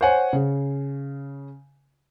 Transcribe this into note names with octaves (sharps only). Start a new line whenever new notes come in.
C5 C#5 F#5 G#5
C#3